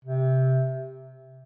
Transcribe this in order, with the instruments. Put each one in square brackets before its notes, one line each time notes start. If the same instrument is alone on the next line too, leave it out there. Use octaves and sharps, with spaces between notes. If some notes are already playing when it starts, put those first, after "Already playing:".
[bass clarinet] C3